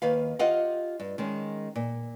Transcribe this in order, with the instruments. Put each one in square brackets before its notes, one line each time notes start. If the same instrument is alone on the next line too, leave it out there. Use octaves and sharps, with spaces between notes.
[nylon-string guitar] D#2 D#3 B4 F5
F4 G4 D#5 F5 F#5
G2
D#3 G#3 C#4
A#2